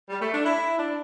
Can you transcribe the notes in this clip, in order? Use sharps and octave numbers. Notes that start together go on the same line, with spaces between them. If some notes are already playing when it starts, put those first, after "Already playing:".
G3
A3
D4
E4
D4